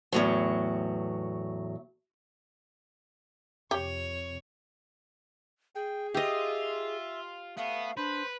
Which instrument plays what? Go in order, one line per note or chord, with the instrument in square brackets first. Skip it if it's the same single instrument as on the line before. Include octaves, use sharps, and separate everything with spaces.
[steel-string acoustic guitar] E2 A2 F#3
[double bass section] F2 C3 [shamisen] G4 [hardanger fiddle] C#5
[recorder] G#4 [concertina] G5
[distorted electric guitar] F4 [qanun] G4 D#5 [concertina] E5
[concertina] A3 [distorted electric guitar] B3 [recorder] F5
[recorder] D4 [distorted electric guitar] B4 [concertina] C5 B5